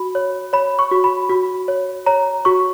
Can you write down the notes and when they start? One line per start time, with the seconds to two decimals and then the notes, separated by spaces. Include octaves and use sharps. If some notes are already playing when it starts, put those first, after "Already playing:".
Already playing: F#4 B5
0.15 C#5
0.53 C#5 B5
0.79 C#6
0.91 F#4
1.04 B5
1.30 F#4
1.68 C#5
2.06 C#5 A#5
2.45 F#4 C#6